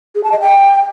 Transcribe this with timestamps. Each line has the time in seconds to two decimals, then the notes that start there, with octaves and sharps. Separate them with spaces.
0.15 G#4
0.24 A5
0.32 D#5
0.41 G5